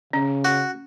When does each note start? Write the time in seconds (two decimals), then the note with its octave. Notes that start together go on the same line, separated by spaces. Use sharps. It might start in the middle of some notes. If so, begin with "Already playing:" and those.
0.13 C#3 C#4
0.45 F#4